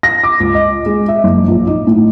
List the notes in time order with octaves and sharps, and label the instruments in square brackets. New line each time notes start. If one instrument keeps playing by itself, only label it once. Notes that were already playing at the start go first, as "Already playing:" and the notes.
[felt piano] A#6
D6
C#2
D#5
G#3
E5
F#1
A#1
D#4
A2